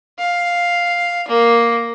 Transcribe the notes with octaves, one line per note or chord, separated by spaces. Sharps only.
F5
A#3